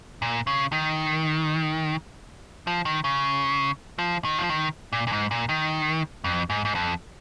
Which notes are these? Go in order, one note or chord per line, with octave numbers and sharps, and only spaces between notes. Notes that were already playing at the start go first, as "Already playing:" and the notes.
A#2
C#3
D#3
F3
D#3
C#3
F3
D#3
F3
D#3
A#2
A#2
G#2
A#2
D#3
F2
G#2
G#2
F2